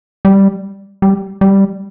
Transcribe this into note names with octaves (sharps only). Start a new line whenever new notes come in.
G3
G3
G3